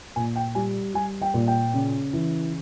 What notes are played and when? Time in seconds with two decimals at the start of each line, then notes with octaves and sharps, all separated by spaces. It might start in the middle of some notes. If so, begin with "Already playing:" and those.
0.16 A#2 G#5
0.36 G5
0.55 G3 G#5
0.94 G3 G#5
1.22 G5
1.34 A#2
1.47 G5
1.74 C#3
2.13 E3